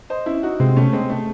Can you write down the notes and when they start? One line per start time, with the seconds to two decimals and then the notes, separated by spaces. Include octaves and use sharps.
0.10 C5 D#5
0.26 C#4 E4
0.43 D#4 F#4
0.60 C3 G#3 C4
0.77 A3 C#4
0.93 G#3 C4
1.10 A3